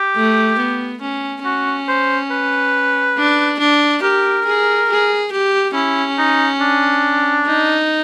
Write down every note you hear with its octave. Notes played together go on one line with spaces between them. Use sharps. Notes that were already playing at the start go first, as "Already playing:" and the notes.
Already playing: G4
A3
B3
C#4
C#4 F#4
C5
B4
D4
D4
G4 A#4
G#4
G#4
G4
C#4 E4
D#4
D4
D#4